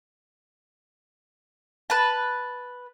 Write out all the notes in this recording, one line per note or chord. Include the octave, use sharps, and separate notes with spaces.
B4 A5